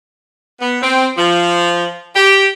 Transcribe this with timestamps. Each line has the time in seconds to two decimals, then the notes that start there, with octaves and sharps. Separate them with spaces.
0.61 B3
0.82 C4
1.17 F3
2.16 G4